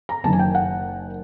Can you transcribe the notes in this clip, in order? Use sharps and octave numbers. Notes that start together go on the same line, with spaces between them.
A#5
F#1 F#2 D#3 A5
G#5
G5
F#5